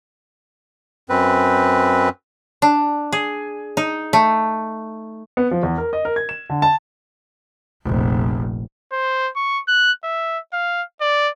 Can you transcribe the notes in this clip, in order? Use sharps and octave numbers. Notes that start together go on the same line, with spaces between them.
F#2 C4 B4
D4
G#4
D#4
A3
B3
F3
E2
A#4
D#5
A#4
G#6
E7
D3
A5
F1 A#1
C5
C#6
F#6
E5
F5
D5